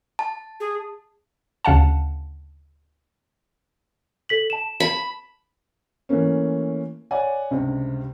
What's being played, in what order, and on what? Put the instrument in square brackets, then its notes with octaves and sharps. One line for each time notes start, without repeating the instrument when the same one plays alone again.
[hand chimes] A5
[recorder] G#4
[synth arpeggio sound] D2 C#3 F5 F#5 A5
[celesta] A4 B6 F#7
A5 E7
[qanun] B5
[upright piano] E3 A3 A#3 C#4
C#5 D5 F#5 G#5
C#2 G2 C3